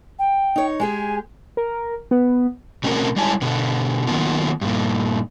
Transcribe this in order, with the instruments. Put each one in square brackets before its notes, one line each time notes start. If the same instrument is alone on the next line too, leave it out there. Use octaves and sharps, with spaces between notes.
[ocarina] G5
[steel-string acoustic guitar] D#4 C#5
[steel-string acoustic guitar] G#3 G4 G#4 [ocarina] G#5
[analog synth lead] A#4
B3
[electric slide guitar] B2 A3 C4 C#4 F#4 A#4
G3 G#3 E4 C#5 G#5 A5
B2 D3
D#3 F#3 A#3 B3 F4
G2 A#2